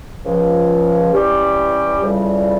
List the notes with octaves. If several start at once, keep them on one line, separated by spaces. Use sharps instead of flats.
C#2 C#3 F3
E3 G3 C#4 G4
F2 C#3 E3 G3